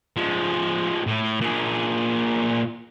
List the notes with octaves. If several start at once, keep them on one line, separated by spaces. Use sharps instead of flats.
F3 G#3
A2
A#2 G#4